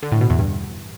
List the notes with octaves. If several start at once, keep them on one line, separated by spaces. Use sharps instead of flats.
D3
A2
B2
E2
G2